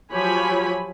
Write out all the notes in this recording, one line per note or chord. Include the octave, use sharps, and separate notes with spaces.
F3 F#3 G4 C#5 G#5 B5